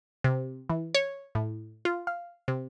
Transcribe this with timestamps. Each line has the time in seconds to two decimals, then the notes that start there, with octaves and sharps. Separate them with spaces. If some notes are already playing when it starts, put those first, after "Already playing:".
0.24 C3
0.70 E3
0.95 C#5
1.35 A2
1.85 F4
2.07 F5
2.48 C3